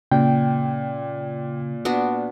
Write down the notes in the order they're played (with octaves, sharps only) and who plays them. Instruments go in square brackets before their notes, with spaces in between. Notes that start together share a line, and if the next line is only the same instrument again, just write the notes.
[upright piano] A#2 [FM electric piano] C#3 [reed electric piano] G5
[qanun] B3 D4 F#4